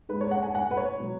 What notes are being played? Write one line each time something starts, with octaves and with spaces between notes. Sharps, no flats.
G#2 G#3 B4
C#5
F#5
G#5
F#5
B4
C#5
B2 F#3